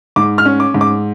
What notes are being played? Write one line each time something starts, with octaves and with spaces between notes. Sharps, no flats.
G#2 D6
F6
C#4
D6
G#2
D6